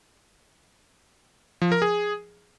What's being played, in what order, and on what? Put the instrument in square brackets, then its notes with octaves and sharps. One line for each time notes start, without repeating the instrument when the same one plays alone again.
[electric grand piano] F3
A#4
G#4